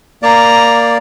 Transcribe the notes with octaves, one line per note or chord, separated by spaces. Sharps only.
A#3 D5 A#5